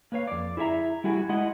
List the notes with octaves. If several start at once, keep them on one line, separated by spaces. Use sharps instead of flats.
A#3 B4 C#5 F5
F2 D5
E4 G#4 D5 E5 A#5
G3 E4 F#4 G#4
G#3 E4 D#5 F#5